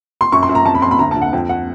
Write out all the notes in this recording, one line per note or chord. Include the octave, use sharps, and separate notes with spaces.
C6
F#2 C#6
C6
F#2
A#5
F2 A5
B5
F2 C6
B5
D2 A#5
A5
D2
F#5
F2 G5
F#5